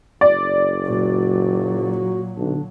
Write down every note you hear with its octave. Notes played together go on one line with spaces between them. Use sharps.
F#1 D5
A#2 F#3 F#4
B1 D3 D4